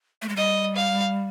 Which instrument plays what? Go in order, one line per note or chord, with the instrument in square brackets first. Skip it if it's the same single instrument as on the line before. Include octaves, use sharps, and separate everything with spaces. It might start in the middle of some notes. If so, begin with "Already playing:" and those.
[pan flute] A3
G#3
[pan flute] G3 [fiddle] D#5
[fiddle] F5